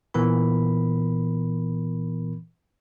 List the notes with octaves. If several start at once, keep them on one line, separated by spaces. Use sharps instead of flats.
A#2 E3 B3 A#4 B5